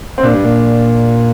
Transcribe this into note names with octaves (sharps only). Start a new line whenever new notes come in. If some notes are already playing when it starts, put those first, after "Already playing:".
C4
A#2 D4
G2
A#2